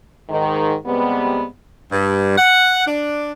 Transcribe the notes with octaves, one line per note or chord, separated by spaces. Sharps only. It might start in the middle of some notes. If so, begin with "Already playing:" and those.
G#2 D#3
C3 G3 G#3 B3
G2
F#5
D4